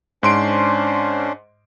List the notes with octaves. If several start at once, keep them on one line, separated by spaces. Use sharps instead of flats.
G#2 C#4 D4 C5 C6 D7